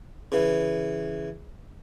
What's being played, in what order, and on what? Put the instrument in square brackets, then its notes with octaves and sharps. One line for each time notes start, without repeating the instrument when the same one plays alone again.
[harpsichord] C#3 E3